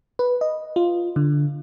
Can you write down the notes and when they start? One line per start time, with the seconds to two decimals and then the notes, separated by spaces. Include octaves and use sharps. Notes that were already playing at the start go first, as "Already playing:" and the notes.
0.19 B4
0.41 D#5
0.76 F4
1.16 D3